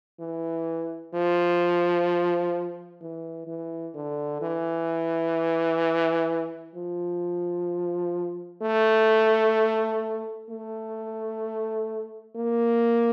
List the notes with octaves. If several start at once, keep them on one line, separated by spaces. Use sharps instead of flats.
E3
F3
E3
E3
D3
E3
F3
A3
A3
A#3